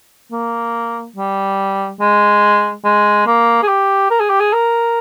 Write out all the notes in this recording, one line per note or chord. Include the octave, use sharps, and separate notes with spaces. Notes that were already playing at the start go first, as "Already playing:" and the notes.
A#3
G3
G#3
G#3
A#3
G#4
G4
A#4
G#4
G4
G#4
A#4